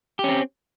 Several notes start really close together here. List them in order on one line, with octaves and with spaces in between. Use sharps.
G4 C#4 C4